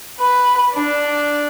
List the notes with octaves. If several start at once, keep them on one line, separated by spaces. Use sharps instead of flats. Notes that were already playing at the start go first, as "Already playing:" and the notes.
B4
D4